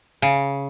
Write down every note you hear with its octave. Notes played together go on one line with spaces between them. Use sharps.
C#3